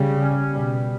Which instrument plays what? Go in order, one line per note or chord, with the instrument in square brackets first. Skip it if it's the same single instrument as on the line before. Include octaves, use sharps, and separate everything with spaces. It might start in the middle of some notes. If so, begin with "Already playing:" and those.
Already playing: [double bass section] C#3 [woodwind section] G3
[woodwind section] C#4
[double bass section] B2 [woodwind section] G3